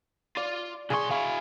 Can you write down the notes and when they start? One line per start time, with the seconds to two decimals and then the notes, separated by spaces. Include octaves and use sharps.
0.37 F4 D5
0.90 B1 G#4 C6 C#6
1.11 E4 F5 C#6